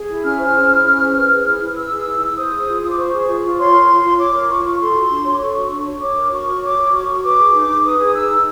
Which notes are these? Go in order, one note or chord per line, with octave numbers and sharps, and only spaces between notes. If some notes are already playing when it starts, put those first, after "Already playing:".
Already playing: G#4
E4
C#4 F6
C5
G#4
E4
C#4
C5
B4
G#4
E4
E4
B4 E6
G#4
E4
E4
C5 D#6
G#4
F4
F4 D#6
D6
C5 C#6
G#4
F4
F4
C#5 C6
A#4
F4
F4
C#5 D6
A#4
F4 C#6
F4
A4 C6
F#4
D4
C#5
D6
A4 C#6
F#4
D4
C#5
C#5 D6
A#4
F#4 C#6
F#4
C#5 D6
A#4
F#4 C#6
F#4
B4 D6
G#4
D#4
D#4
B4 D#6
G#4
D#4 E6
D#4